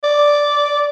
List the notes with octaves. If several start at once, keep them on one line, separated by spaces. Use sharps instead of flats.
D5